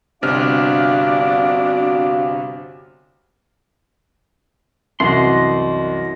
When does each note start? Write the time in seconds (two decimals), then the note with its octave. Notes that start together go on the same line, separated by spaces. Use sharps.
0.22 G1 C3 D4 F#4 F5 F6
5.00 C2 F#2 E3 D#5 F#5 C6